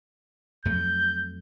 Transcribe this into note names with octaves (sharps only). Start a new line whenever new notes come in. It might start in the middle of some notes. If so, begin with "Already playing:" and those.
F2 F#3 A3 G6